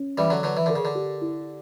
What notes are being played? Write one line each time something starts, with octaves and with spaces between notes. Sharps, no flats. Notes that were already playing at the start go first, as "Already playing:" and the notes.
Already playing: C#4
E3 G3 D5
D3 F#3
D3 F#3 B4
E3
D3 A#4
C#3
D3
G4
E4